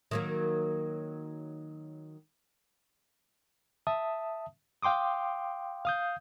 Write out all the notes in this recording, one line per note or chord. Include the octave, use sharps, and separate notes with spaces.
D#3 F#3 A#3
E5 A5 D#6
F5 G5 C6 D6 D#6
F5 D#6 G6